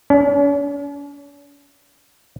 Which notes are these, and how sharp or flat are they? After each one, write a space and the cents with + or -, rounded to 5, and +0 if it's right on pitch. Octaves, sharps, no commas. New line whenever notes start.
C#4 +45